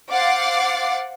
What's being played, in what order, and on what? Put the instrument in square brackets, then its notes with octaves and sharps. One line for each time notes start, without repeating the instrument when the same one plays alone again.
[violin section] C5 F5 F#5 D6 A6 C7